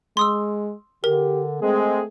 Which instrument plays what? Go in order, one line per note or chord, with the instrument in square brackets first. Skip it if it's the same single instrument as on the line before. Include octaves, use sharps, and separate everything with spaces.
[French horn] G#3 [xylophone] C6 D#6 E6
[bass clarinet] D3 [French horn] G4 [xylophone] A#4
[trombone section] G#3 C4 [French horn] A3 [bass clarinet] G#4